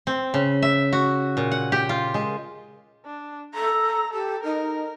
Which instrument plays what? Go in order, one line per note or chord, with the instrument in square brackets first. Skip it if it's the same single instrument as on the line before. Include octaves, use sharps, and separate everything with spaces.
[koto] C4
C#3
E5
F#4
A#2
F#5
G4
F4
G#3
[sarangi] D4
[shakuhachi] A4 [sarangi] A#5
[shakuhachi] G4 [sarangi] A4
[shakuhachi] D#4 [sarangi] A#4